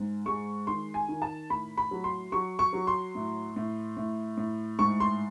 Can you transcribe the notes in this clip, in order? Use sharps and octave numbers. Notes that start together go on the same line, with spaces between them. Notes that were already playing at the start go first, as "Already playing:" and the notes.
Already playing: G#2
G#3 C#6
D#3 C6
G#5
D#3
A5
A2 B5
B5
F#3
C6
F#3 C#6
C#6
F#3
C6
A2
A2
A2
A2
G#2 C#6
C6